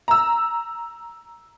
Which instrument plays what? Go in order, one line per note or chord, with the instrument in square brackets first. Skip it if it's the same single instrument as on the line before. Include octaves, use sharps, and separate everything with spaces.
[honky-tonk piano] A#5 E6